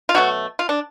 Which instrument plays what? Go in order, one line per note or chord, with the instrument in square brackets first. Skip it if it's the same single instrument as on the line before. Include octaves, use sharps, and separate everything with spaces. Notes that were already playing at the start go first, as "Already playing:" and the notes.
[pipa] F4
B2 F#3 A3 F#4
F4
D4